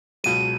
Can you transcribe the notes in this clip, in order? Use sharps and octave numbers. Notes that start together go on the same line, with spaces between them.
C#2 B2 F#3 D#7